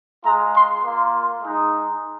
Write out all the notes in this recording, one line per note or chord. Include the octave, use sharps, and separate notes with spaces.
G#3 F4 A#5
C6
A#3 F4 C6
G#3 D#4